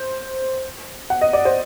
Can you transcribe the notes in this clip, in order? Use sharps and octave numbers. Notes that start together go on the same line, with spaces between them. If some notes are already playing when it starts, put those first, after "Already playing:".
Already playing: C5
F#5
D#5
D5
C5